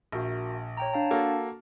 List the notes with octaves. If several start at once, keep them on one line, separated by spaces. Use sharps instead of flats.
A#1 F#4 A#4 E5
C#5 G5 A#5
D4 F5 A5
A#3 F#4 A4